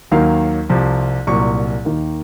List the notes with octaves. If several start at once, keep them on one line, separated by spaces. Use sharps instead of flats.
D#2 D#3 F#3 A#3 F5
C2 C3 F3
C2 A#2 F#3 C#6
D#2 D#3 A#3